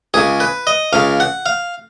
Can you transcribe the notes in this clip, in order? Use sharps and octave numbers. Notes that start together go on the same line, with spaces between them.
C#2 C#3 G#4
B4
D#5
C#2 C#3 F5
F#5
F5